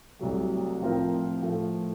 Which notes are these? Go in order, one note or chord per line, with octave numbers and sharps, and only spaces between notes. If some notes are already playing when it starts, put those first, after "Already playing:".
C2 C3 F#3 A3
A2 F3 C4 F4 A#4
A2 F3 A3